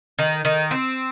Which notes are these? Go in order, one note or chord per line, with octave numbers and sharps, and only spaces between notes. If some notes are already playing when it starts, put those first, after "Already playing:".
D#3
D#3
C4